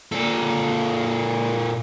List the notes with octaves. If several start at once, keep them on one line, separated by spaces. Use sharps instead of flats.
A#2 A4